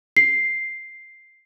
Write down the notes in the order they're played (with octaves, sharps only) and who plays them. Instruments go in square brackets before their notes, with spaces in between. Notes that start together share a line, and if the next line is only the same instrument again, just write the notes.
[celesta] C7